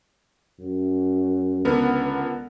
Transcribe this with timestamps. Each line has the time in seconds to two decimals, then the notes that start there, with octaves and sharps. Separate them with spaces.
0.60 F#2
1.65 C#2 D3 B3 A#4